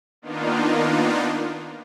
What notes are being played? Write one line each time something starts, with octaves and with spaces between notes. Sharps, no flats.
D#3 A#3 B3 D4 D#4 F4